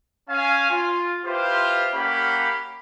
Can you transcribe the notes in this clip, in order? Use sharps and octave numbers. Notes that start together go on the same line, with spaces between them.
C#4 F5 G#5
F4
E4 F4 G4 B4 C5
A#3 C#4 G4 F5 F#5 B5